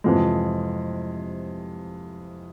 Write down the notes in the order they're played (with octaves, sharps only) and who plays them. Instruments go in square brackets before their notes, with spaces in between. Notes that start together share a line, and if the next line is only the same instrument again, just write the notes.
[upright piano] F2 C3 E3 G#3